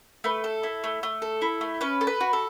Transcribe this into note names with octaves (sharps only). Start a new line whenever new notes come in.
A3 B4
A4
E4
A3
A3
A4
E4
A3
C#4 B4
A4
B4
F#4
A4